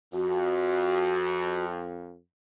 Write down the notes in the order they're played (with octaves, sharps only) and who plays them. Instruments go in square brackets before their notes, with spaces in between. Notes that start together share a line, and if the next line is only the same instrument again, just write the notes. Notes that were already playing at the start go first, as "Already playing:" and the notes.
[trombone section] F2 [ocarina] F#4